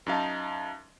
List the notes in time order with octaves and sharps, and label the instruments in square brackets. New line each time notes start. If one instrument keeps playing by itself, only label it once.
[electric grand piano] F#2 D#4 F5 A5